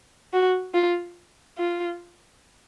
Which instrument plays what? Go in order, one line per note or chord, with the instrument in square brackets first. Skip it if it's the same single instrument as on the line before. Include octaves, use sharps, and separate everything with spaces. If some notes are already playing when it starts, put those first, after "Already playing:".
[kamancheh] F#4
F4
F4